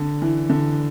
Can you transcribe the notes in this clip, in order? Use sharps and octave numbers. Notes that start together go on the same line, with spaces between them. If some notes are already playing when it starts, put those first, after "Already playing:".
Already playing: D3
E3
D3